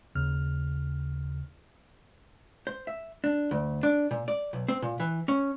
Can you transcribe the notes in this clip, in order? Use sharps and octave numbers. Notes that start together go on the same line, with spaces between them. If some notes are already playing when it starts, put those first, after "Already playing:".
D#2 C#3 F6
C5
E5
D4
D2
D4
A#2
D5
B1
C4
A#2
E3
C#4